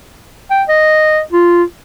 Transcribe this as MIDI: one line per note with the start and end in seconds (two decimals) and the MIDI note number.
0.51 0.63 79
0.69 1.20 75
1.33 1.63 65